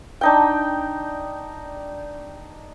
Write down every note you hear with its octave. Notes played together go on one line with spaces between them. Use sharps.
D4 D#4 G5